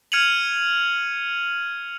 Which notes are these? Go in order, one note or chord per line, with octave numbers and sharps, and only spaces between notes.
F6 G#6 C#7 D#7 F7 F#7